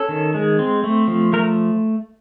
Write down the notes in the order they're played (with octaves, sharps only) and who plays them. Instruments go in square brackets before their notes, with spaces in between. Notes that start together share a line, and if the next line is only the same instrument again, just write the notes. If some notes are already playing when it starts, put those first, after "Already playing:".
Already playing: [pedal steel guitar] C#4 A4
D#3
G#3
C4
A3
F3
A3 A#4